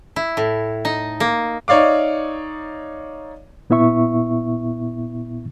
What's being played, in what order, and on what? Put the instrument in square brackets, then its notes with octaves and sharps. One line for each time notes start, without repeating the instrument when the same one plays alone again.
[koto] E4
A2
D#4
A#3
[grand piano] D#4 C#5 D5 F5 D6
[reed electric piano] A#2 B3 E4 E5 C#6